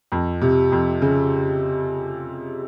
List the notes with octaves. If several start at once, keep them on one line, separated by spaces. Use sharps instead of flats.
F2
C3
F2
C#3